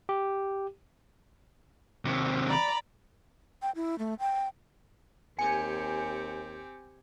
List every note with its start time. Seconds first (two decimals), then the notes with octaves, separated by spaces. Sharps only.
0.09 G4
2.05 D#2 C3
2.48 D5 A#5 B5
3.62 G5
3.75 E4
3.99 A3
4.19 G5
5.39 D#2 C4 G4 G#5 C#7